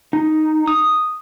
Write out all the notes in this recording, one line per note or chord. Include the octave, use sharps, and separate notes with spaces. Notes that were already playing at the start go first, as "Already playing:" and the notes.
D#4
D#6